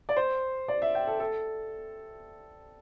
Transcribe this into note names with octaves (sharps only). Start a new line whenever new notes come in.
D5
C5
D5
E5
G5
A4
A4